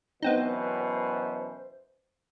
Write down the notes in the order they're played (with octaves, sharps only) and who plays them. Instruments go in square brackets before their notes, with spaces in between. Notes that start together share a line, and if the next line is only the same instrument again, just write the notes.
[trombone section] F#2 B2 E3 [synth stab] B3 C4 D#4 [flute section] C5